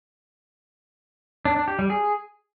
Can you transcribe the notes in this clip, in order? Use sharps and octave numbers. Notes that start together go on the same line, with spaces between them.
D4
D4
G4
G3
G#4